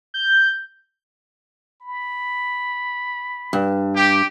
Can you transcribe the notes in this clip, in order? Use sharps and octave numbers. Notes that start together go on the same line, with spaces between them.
G6
B5
G2
G4